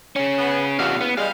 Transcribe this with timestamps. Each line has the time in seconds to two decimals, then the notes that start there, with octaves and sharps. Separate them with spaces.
0.16 C#4 G#4
0.38 B3
0.79 E2 C3 F#4 F5
1.01 B3
1.17 G3 G#3 F5